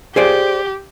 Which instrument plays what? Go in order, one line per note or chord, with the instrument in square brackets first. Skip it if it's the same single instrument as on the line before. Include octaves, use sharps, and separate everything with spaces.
[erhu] G4 [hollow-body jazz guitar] G#4 C5 D5